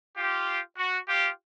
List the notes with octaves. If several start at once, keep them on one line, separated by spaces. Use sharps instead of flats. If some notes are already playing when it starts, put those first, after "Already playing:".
F4 G4
F#4
F4 G4